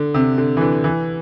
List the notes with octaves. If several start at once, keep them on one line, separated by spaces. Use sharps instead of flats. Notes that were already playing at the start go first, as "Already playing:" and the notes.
Already playing: D3
C3
D3
E3
D3
E3